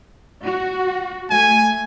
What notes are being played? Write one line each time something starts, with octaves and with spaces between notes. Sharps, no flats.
F#4
A3 G#5